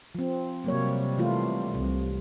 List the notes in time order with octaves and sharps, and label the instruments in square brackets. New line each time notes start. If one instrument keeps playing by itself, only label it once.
[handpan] F3 C4
[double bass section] C3 G3 [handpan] F#3 A#3 C#5
[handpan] E3 A3 F4
[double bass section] C2 [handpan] C3